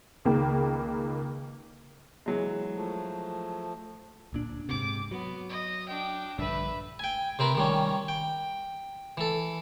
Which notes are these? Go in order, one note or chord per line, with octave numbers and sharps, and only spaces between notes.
C#2 D#3 A#3 G5
E3 F#3 G#3
F3 A3
D1 A#2 D4
G#2 C3 D6
F#3 B3
D#5
D4 G5
A#1 G2 D3 B4 E5
G5 G#5
C3 C4 A#4 B4
D#3 G3 C#4
G5
E3 A4